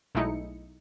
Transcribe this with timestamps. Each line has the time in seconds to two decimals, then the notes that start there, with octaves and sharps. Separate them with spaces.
0.15 B1 G#3 A3 D#4 E4 C#7